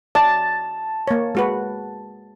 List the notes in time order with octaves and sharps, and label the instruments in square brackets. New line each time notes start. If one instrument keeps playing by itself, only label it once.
[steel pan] D5 [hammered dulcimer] A5
[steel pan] A#3 C#5
G#3 F#4 B4